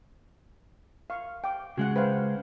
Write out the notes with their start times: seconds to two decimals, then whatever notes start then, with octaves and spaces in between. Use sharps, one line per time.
1.10 F5 C#6
1.44 G5 D6
1.77 C#3 G#3 F#4 F#5
1.96 B4 C5 F5